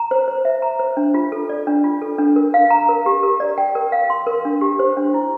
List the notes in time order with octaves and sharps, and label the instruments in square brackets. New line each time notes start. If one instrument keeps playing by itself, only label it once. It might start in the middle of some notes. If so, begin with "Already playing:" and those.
Already playing: [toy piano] A#5
C5
C5
E5
A#5
C5
D4
F4
A4
D5
D4
F4
A4
D4
A#4
F5
A#5
A#4
G4
A#4
D5
G5
A#4
F5
C6
A#4
D4
G4
C5
D4
E4